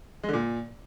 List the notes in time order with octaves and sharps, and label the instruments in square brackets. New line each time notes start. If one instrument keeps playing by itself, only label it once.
[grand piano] G#3
D3
A#2